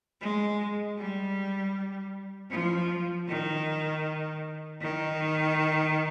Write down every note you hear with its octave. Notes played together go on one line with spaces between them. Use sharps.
G#3
G3
F3
D#3
D#3